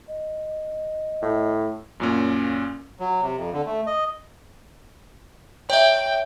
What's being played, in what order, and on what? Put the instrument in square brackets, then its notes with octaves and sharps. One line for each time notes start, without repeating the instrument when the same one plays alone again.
[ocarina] D#5
[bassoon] A2
[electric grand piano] F#2 A#2 C#4
[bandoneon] F#3
C3
F2
D3
A3
D#5
[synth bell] C#5 E5 [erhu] G5